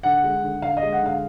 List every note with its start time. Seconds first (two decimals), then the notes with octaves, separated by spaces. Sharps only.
0.03 D3 F#5
0.24 G#3
0.43 D3
0.62 D3 F5
0.77 D#5
0.83 G#3
0.92 F#5
1.02 D3 F5